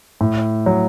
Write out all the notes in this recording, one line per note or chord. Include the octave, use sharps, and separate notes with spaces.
A2
F#3